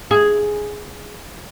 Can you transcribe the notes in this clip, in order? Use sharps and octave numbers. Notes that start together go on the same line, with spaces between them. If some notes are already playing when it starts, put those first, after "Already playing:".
G#4